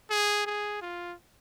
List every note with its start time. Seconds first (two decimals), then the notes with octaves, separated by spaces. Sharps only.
0.10 G#4
0.46 G#4
0.81 F4